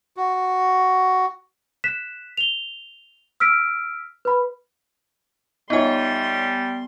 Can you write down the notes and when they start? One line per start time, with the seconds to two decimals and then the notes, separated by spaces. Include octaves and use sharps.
0.17 F#4
1.84 F#6 B6 E7
2.37 F7 G7
3.40 E6 F6 B6 D7
4.25 B4 B5
5.70 G3 B3 D#4 F4 C#5 G#5 C6